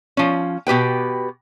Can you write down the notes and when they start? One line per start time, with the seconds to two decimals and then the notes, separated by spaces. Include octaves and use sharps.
0.17 F3 C#4
0.67 B2 G4 B4 G5